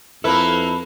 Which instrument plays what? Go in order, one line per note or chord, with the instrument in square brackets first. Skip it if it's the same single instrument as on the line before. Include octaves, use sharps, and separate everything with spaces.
[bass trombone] F2 [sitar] A#3 E4 [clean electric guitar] A4 B4